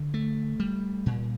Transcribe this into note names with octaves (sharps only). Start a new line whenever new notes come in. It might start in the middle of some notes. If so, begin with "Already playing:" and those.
Already playing: D3
A3
G3
A#2